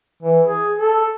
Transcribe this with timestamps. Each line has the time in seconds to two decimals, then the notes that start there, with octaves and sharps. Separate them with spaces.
0.23 E3
0.45 G#4
0.78 A4